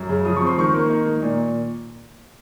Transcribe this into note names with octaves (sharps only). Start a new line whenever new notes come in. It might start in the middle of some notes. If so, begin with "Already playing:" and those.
Already playing: F#2
C#3
F3 D#6
C#6
C4
C6
D#3 C#6
A#3
D#4
D#3
A#2